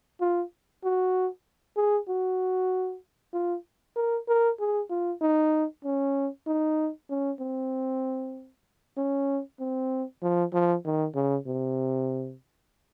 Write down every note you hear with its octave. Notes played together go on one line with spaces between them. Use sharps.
F4
F#4
G#4
F#4
F4
A#4
A#4
G#4
F4
D#4
C#4
D#4
C#4
C4
C#4
C4
F3
F3
D#3
C#3
C3